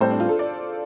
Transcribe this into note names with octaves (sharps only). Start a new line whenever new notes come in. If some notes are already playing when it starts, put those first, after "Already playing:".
A2 G3 C4 A4 C5
D4
F4
A4
D5